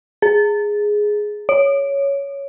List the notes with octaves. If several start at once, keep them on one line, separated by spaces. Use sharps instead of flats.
G#4
C#5